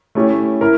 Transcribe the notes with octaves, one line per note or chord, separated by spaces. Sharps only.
A3 C#4 E4 G4 C#5
E4 A#4